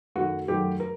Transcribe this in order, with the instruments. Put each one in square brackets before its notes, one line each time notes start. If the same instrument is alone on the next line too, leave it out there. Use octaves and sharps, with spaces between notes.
[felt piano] F#2 D#3 F#3 A3 F#4
F#2 D#3 F#3 A3 G4
A#4